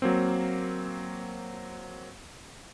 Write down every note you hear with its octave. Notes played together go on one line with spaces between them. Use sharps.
F#3 A#3 C4